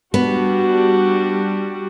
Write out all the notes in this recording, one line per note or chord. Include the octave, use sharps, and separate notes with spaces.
G3 B3 D4 F#4